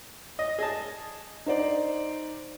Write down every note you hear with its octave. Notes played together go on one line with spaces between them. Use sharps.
D#5
G#4 D#5 A5
D#4 C5 D5